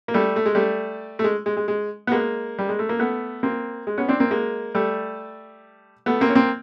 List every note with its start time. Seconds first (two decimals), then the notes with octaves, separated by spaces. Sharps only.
0.08 A#3
0.14 G3 A3
0.36 A3
0.46 G#3
0.55 G3 A3
1.19 A3
1.24 G#3
1.46 G#3
1.57 G#3
1.68 G#3
2.07 B3
2.12 G#3 A#3
2.59 G3
2.69 G#3
2.79 A3
2.89 A#3
2.99 A3 B3
3.43 A#3 C4
3.87 G#3
3.98 B3 C#4
4.09 C4 D4
4.20 A#3 C4
4.31 G#3 A#3
4.75 G3 A3
6.06 A3 B3
6.21 A#3 C4
6.29 C#4
6.35 A#3 C4